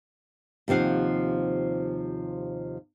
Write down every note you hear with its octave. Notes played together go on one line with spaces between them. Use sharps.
D#2 C3 F3 F5 F#5